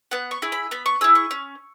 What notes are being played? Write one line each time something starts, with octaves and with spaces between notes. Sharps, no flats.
B3 F#5
C#6
E4 G#4
B5
B3 B5
C#6
E4 G#4 E6
C#6
C#4